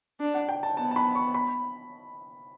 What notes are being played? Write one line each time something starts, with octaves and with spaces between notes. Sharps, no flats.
D4
F#5
G5
A5
B3 A5
A5
B5
C#6
B5